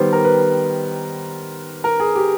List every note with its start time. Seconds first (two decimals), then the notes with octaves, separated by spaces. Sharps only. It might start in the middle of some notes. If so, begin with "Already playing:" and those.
Already playing: D#3 G3 B3 C5
0.13 A#4
0.25 B4
1.84 A#4
2.00 G#4
2.15 G4